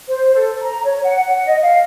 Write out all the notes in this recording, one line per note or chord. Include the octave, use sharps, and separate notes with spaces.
C5
A4
A#5
C#5
F#5
F#5
D#5
F5